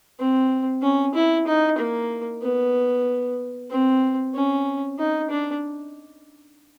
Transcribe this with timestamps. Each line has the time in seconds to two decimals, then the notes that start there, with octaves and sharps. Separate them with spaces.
0.19 C4
0.82 C#4
1.15 E4
1.47 D#4
1.78 A#3
2.43 B3
3.71 C4
4.35 C#4
4.98 D#4
5.30 D4